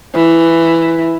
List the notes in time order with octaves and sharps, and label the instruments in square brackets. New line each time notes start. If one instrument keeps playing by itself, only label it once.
[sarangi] E3